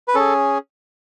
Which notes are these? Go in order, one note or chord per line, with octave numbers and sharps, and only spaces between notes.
B4
C#4 G#4 A4